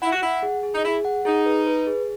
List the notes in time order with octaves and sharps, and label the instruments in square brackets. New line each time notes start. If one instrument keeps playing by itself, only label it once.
[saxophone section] E4 [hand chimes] F#5
[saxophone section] F#4
[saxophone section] E4 [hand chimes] F#5
[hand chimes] G#4
G#4
[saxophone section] D#4
[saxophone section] E4 [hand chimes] G#4
[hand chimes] F#5
[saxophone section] D#4 [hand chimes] G#4
[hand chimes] B4
B4
G#4